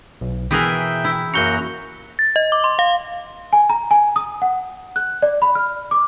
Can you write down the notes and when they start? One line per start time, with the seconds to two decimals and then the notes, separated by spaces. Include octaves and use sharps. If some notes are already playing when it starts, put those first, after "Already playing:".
0.21 B1
0.51 B2 E3 G#4 A#4 E5 G5 F#6
1.04 E4
1.34 F#2 A#3 F#4 A#5 G6 C#7
2.19 A6
2.36 D#5
2.52 D6
2.64 C6
2.79 F5
3.53 G#5
3.70 A#5
3.91 G#5
4.16 D#6
4.42 F#5
4.96 F#6
5.22 D5
5.42 B5
5.55 F6
5.91 D6